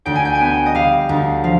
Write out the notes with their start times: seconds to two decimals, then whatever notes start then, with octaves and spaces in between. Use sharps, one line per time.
0.06 D2 G5
0.15 G#5
0.25 G5
0.35 G#5
0.41 B3 G5
0.66 D#5
0.75 G3 F5
1.09 D2
1.44 F3 F5